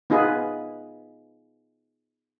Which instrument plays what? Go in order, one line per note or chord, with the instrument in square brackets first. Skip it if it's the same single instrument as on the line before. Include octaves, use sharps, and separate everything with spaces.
[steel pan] B3 D#4 F4 G#4 B4